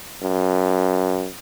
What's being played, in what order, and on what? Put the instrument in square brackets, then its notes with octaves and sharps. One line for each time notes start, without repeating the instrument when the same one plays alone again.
[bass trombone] F#2